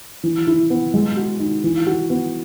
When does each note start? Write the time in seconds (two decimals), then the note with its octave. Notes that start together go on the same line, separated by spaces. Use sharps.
0.23 E3
0.47 E4
0.70 B3
0.94 G#3
1.17 F#4
1.40 D#4
1.64 E3
1.87 F#4
2.10 B3